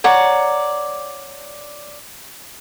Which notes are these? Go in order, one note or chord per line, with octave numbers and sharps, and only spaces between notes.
C#5 D5 F#5 A#5